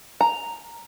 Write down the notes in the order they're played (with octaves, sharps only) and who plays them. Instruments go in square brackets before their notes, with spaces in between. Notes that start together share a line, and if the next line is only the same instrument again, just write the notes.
[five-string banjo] A#5